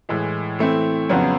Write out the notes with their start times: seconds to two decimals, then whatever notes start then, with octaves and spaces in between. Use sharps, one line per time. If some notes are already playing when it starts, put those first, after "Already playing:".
0.09 A2 E3 G#3
0.59 E3 A3 C4 E4
1.09 F2 C#3 F#3 B3